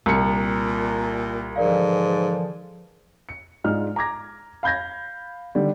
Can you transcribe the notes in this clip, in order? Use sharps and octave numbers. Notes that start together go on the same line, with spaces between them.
C2 A#2 A#5 C#7
G#2 D3 E3 F3 A#4 D5 F5
C#7
G#2 G#3 D4 F4 F6
A#5 D6 G#6 A#6
F5 B5 G6 G#6 A#6
D3 D#3 G3